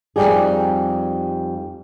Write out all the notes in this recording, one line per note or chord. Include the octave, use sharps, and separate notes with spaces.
F2 A#2 G3 D#4 G4 G#4